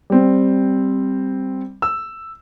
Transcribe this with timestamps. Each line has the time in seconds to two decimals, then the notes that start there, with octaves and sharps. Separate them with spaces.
0.10 G3 C4
1.82 E6